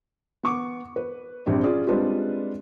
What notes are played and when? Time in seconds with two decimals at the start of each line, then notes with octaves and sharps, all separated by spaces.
0.43 B3 C#6 D6
0.96 B4
1.46 A#1 G3 C4 D4
1.63 C#4 F4 G#4 D5
1.87 G3 G#3 C4 D4 F4 B4